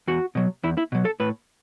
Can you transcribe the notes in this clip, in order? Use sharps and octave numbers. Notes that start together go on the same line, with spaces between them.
E2 F#4
B2 F#3
E2 E4
E4
B2 F#3
A4
A2 B4